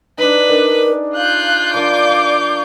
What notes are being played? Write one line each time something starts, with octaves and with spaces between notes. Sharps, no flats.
D4 D#4 B4
D4 D#4 G#4 A#4
F4 F5 F#6 G6
F3 A#3 D4 D5 D6